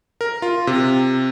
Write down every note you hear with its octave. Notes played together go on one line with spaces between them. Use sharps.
A#4
F4
C3